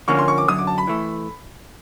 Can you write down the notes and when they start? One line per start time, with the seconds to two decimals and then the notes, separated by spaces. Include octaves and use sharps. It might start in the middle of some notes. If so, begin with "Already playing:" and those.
0.08 D3 F3 A#3 C#4 C#6
0.19 C6
0.28 C#6
0.38 D6
0.48 F#2 D3 F#3 D#6
0.58 D6
0.67 A5
0.78 B5
0.87 E3 A3